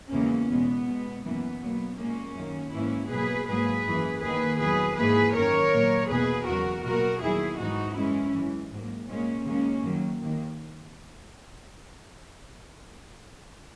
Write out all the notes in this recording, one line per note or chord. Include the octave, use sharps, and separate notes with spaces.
E2 C#3 E3 G#3 A#3 C#4
E2 B2 G#3 B3
B2 G#3
F#2 E3 A#3 B3
B2 F#3 A#3
A#2 G#3 A#3 C#4
F#2 D#3 A#3
G#2 E3 A#3 C#4 E4
B2 F#3 A#3 G#4 B4
G#2 F#3 A#3 G#4 B4
F#2 E3 A#3
D#2 D#3 A#3 G#4 B4
E2 B2 F#3 G#4 B4
G#2 E3 A#3 G#4 B4
F#2 D#3 A#3 A#4 C#5
A#2 F#3 A#3
E2 B2 A#3 G#4 B4
E2 C#3 F#3 F#4 A#4
B2 F#3 A#3 F#4 A#4
E2 D#3 F#3 E4 G#4
G#2 E3 G#3 D#4 F#4
F#2 E3 G#3 C#4 E4
F#2 E3 G#3
G#2 F#3 A#3
A#2 G#3 A#3 C#4
D#2 C#3 G#3 A#3 C#4
F#2 D#3 F#3 A#3
D#2 D#3 A#3